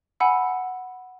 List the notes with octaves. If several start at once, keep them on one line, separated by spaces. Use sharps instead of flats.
F#5 G#5 B5 E6